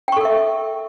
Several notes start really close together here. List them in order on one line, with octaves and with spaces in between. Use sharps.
G5 C#6 A4 A#4 E5